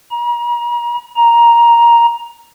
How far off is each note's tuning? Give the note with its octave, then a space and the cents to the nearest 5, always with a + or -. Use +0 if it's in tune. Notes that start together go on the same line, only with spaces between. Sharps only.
A#5 +40
A#5 +10